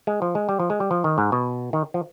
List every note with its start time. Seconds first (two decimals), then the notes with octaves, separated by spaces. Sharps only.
0.07 G#3
0.22 F3
0.35 G#3
0.49 G3
0.60 F3
0.70 G#3
0.80 G3
0.91 F3
1.04 D#3
1.18 G#2
1.32 B2
1.73 D#3
1.94 F3